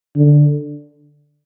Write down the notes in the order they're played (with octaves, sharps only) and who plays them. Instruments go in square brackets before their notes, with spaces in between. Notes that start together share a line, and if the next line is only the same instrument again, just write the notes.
[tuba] D3